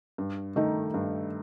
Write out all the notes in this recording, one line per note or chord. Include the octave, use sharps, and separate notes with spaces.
G2
D#3 A3 D#4
G2